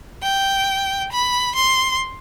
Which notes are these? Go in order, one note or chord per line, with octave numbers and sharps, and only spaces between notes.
G5
B5
C6